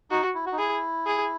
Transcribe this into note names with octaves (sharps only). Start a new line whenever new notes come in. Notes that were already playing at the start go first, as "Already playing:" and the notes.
D#4 F#4
E4
F#4
D#4
E4 G#4
G#4